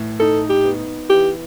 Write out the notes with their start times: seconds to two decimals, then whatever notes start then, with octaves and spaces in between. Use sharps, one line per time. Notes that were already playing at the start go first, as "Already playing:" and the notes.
Already playing: A2 E3
0.20 D#4 A4
0.50 G4
0.65 B3
1.09 E3 G4